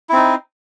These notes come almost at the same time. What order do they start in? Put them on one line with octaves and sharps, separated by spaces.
E4 C4 D#4